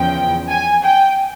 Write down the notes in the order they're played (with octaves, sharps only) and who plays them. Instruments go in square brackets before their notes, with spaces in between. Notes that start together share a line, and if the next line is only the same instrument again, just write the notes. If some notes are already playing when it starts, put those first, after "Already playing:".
Already playing: [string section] E2 C#3 F3 G5
G#5
G5